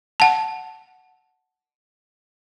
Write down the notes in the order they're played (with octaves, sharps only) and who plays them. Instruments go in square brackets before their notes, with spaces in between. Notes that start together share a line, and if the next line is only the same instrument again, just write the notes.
[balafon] F#5 A5